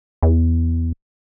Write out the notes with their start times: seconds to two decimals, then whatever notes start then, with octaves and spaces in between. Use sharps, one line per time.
0.23 E2